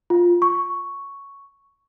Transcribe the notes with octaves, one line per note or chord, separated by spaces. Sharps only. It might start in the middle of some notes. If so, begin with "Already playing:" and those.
F4
C#6